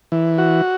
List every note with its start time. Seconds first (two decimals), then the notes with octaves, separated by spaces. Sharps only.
0.12 E3
0.38 F#4